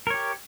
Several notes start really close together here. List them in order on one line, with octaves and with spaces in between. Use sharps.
A#4 C#5 G4